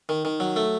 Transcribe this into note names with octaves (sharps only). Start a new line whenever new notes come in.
D#3
D#3
F#3
A3